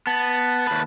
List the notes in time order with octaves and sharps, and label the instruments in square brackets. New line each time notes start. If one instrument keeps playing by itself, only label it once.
[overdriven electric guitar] B3 [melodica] A5
[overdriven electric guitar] D#2 B4